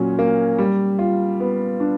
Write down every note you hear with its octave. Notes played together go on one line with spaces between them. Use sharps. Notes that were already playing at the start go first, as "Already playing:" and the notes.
Already playing: A#2 F#3 C#4
A#3
G3
F4
B3
D4